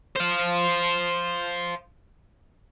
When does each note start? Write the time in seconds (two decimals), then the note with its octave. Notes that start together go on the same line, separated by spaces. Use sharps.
0.16 C5 F5